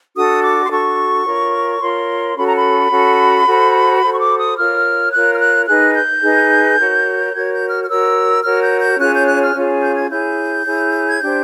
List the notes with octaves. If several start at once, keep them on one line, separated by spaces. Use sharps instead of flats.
D4 F#4 A4 D#6
D6
C6
D4 F#4 A4 C#6
F4 A#4 C#5
F4 A#4 C#5 C6
C#4 F#4 A4 B5
A#5
B5
C#4 F#4 A4
F#4 A4 C5
F#4 A4 C5
C#6
D6
D#6
F4 A#4 C#5 F6
F4 A#4 C#5 F#6
F6
F#6
D#4 G#4 B4 F#6
G6
D#4 G#4 B4
F#4 A#4 C#5
F#4 A#4 C#5 G#6
G6
F6
F6
F#4 A#4 C#5 E6
F#4 A#4 C#5 F6
G6
G6
C#4 F4 G#4 C#5 F#6
G6
F#6
F6
C#4 F4 G#4 C#5
G6
G#6
E4 G#4 C#5 G6
E4 G#4 C#5
G#6
D4 G4 C5 G6